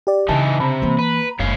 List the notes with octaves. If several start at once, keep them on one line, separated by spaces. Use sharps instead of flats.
G4 D5
C#3 E3 D4 D#4 A5
C3 A#5 B5
E3 A#3
B4
F#1 G#2 D3 C#5 F5